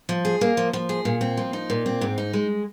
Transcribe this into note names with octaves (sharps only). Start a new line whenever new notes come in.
F3
G#4
A#3
F3
F3
G#4
A#2
C4
F3
D#4
A#2
C4
G#2
D#4
G#3